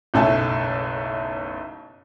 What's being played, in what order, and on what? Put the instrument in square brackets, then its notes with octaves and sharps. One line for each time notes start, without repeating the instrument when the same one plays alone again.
[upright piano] F#1 B1 A3 E5 G#5 A5